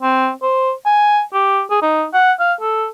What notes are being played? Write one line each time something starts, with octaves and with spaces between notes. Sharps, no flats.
C4
C5
G#5
G4
G#4
D#4
F#5
F5
A4